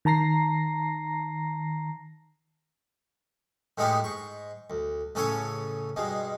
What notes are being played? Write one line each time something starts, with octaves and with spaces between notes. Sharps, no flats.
D#3 A5 A#5 A#6 C7
A2 G#3 B3 D#4 F4 G4
G#2 C#6
D2
A1 C#3 C#4 A4 C#5 G#5
G2 B2 G#3